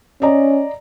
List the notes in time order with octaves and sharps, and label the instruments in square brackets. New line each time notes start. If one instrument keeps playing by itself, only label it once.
[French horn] C#4 [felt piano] D5 D#5 A#5